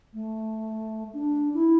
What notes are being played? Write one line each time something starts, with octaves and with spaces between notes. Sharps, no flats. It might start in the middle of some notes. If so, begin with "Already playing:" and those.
A3
D4
E4